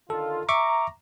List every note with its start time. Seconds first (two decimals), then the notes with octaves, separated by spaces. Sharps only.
0.10 D3 D#3 F4 A4
0.49 E5 A#5 C#6 D6